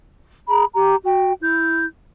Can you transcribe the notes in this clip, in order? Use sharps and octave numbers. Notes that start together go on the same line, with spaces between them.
G#4 A#5 B5
G4 A#5
F#4 G5
E4 G6